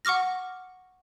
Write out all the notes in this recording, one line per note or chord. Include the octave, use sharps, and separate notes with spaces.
F#5 C#6 D6 F6 A#6